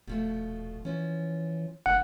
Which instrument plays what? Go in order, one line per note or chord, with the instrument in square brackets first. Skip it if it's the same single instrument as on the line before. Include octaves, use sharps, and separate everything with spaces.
[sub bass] D#1 [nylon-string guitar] B2 F3 A3
[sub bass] E3 [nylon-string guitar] F3 C#4
[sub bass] F#1 [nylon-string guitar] D3 F3 A#3 [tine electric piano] F#5